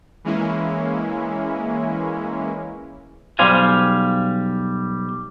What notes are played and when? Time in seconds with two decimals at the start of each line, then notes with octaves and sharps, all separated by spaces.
0.24 E3 G#3 A#3 C#4 E4
3.39 B1 G3 C5 F5 G#5